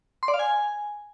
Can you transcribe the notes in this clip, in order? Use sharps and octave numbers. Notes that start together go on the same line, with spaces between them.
C6
D5
F5
G#5